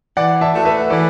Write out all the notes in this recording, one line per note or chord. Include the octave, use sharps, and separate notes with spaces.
E3 D5 F#5
E5 A5
A3 F#4
B4 E5
E3 A4 D5